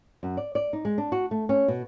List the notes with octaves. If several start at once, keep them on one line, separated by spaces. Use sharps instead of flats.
F#2
D5
D5
D#4
G#3
D4
F#4
A3
C#4
B2